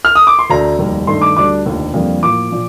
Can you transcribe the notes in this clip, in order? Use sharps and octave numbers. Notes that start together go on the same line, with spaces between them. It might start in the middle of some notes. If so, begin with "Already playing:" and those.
F6
D#6
D6
C6
D2 D3 A3 A#5
F1 D#2 D#3 G3
G2 D#3 A3 D#4 C6
D6
D2 D3 G3 D4 D6
F1 D#2 D3 F3
F2 D3 G3 A#3
A2 F3 A#3 D6
A#2 F3